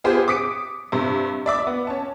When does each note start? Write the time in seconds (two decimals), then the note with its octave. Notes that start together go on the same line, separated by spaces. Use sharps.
0.04 B3 F4 G4 G#4 C5
0.28 D6 D#6 B6 C#7 D7
0.92 G2 C3
1.46 D5 E5 D6
1.67 B3
1.87 C#4 A5